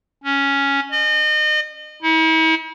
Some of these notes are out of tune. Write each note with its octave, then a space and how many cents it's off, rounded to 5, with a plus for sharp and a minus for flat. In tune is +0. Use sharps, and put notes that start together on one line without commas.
C#4 +5
D#5 -35
E4 -45